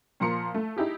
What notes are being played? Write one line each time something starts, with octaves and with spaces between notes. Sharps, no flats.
A#2 F3 A#4 A#5 C6 C#7
A3
D#4 E4 G4 G#4